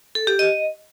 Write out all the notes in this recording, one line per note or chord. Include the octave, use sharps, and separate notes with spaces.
A4
G4
D#5